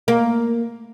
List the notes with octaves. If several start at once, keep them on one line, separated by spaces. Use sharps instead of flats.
A#3